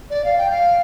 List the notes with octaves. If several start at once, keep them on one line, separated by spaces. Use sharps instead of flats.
D5
F5
G5
F5